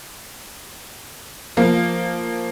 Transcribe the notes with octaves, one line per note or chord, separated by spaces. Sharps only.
F3 A#3